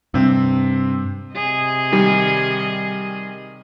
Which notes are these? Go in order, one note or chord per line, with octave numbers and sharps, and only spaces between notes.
G2 C3 C4
C3 G#4 D#5
D#3 G3